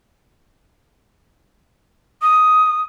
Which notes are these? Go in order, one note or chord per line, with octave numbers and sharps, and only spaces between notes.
D#6